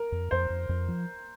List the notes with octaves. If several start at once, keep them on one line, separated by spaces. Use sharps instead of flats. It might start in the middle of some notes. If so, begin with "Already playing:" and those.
Already playing: A#4
F2
F2 C5
F2
F2
F3